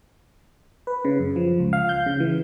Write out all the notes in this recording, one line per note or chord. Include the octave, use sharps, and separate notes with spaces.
B4
C#3
F#2
F3
C#2
F5
G6
C#3
E3